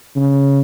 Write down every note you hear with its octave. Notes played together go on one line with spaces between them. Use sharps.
C#3